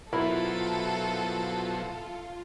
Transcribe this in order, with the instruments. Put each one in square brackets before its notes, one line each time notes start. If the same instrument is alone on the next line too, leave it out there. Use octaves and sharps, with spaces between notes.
[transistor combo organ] B2 F#3 C5 [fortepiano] E4 A#4 B5 [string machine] F4 [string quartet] A4